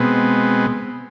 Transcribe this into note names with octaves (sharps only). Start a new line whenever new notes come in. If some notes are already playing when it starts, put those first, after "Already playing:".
Already playing: B2 G#3 B3 C4